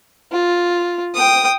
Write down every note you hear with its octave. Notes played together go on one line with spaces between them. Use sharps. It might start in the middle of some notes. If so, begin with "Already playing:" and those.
F4
G5 D#6